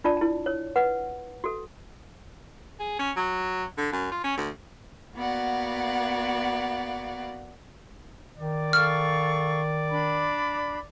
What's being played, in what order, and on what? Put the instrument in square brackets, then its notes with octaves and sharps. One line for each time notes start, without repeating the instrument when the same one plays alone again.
[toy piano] D4 F4 D5 A5
E4 A5
C#5
B4 F#5
F#4 A4
[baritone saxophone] G#4
C#4
F#3
D3
F#2
F4
C#4
D2
[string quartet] A#3 B3 F#4 D5 F5 F#5
[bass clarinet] D#3 [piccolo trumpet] D5
[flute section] A4 F5 C#6 [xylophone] F6
[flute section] D4 B5